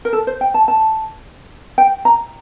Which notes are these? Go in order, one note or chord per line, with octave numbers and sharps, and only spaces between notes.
A#4
A4
C5
G5
A5
A5
G5
A#5